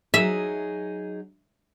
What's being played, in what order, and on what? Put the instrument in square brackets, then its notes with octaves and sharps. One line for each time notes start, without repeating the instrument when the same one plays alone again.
[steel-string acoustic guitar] F#3 D#4 G#4 [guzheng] E5